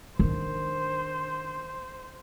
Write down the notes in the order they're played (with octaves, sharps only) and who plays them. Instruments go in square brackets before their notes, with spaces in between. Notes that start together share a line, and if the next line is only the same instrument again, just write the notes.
[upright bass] D#3 D4 [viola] C5